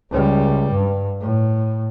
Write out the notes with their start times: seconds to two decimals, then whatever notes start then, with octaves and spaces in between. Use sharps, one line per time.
0.11 C#2 G3
0.71 G2
1.20 A2